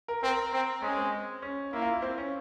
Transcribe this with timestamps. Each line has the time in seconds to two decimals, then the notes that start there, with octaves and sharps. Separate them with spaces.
0.08 A#4
0.23 C4 A#4
0.53 C4
0.82 G#3 C#4
0.97 C4
1.42 C#4
1.73 A#3 E4
1.82 F4
1.93 E4
2.02 C4
2.18 C#4